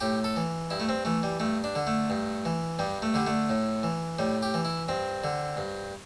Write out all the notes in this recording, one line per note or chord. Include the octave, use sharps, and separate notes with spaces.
A2 G4
A4
E3
G2 E4
A3
C4
E3 A3
G3
G2 A3
D4
D3
A3
G2
E3
G2 G3
A3
D3 G3
A3
A2
E3
A2 G3
G4
E3
E4
G2 C4
D3
G2